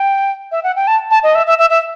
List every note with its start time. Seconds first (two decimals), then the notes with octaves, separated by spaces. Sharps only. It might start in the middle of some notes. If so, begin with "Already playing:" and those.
Already playing: G5
0.52 E5
0.63 F#5
0.76 G5
0.87 A5
1.11 A5
1.23 D#5
1.35 E5
1.47 E5
1.59 E5
1.70 E5